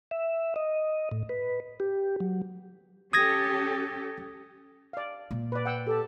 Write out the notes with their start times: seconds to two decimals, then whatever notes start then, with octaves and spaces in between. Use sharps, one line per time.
0.11 E5
0.56 D#5
1.11 A2
1.29 B4
1.80 G4
2.20 F#3
3.13 C#4 G4 A4 D#6 G#6 A#6
4.93 D5 F5
5.31 A#2
5.52 B4 D5
5.65 F#5 G5 E6
5.87 G4 A4 A5